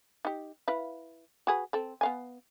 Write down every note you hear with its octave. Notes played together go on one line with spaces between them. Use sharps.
D#4 G4
E4 B4 F5
F#4 G#4 B4
C4 A4
B3 F5 G#5